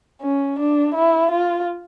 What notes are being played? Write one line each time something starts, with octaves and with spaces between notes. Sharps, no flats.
C#4
D4
E4
F4